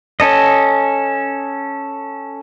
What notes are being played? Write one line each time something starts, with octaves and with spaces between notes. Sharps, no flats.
C#4 A4 D#5